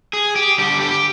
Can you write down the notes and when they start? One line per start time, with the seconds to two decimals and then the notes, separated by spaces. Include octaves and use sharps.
0.13 G#4
0.36 G4
0.58 D3 G3 G4
0.81 G4